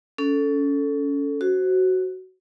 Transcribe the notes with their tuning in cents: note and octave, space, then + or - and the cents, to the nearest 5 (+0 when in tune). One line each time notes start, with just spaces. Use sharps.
C#4 +25 A4 +0
F#4 +10 C5 +0